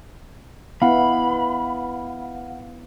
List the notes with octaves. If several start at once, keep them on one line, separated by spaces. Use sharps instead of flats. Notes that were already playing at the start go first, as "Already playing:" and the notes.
B3 E4 F5 F#5 B5